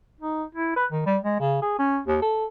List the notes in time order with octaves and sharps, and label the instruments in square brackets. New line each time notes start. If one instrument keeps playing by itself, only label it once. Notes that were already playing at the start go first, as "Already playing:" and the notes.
[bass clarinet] D#4
E4
B4
D#3
G3
G#3
C#3
G#4
C#4
D#2
A4